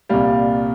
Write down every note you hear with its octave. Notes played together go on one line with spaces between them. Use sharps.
C2 A#2 G3 F5